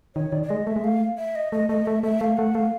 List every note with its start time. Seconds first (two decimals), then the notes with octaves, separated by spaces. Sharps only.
0.15 D#3 C#5
0.32 D#3 D5
0.43 D5
0.49 G#3 D#5
0.67 A3 E5
0.76 G#3
0.83 A3 F5
1.18 E5
1.35 D#5
1.52 A3 D#5
1.69 A3 D#5
1.86 A3 E5
2.03 A3 E5
2.20 A3 F5
2.37 A3 F#5
2.54 A3 F5